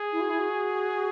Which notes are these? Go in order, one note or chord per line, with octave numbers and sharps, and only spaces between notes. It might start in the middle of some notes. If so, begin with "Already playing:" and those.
Already playing: G#4
E4
F#4
E4
F#4